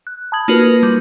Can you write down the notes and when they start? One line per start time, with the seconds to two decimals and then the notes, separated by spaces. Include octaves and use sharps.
0.07 F#6
0.32 A5 B5 D#6 G#6 F#7
0.48 A#3 D#4 F4 F#4 A#4 B4
0.83 G3